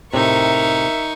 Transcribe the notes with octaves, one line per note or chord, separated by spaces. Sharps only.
A2 C3 D#4 A#4 E5 C#6